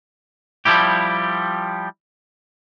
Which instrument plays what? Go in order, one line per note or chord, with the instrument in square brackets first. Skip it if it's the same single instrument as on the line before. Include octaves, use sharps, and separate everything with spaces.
[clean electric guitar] F3 G3 E4 G4